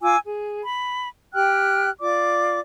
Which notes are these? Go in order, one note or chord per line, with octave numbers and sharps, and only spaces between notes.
F4 G#5 D6 E6
G#4
B5
G4 G5 F6 F#6
F4 D5 D6